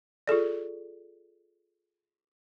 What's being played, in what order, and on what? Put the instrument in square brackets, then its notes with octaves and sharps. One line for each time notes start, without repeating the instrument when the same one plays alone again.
[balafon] F4 G#4 A4 D5